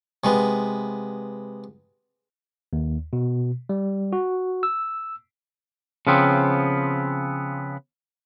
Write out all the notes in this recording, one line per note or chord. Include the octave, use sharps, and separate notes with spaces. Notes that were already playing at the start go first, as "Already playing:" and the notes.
C3 G#3 B3
D#2
B2
G3
F#4
E6
C#3 F3 B3 C4